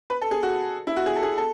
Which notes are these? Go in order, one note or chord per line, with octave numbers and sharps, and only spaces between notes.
B4
A4
G#4
F#4
E4
F#4
G#4
A4
G#4
A4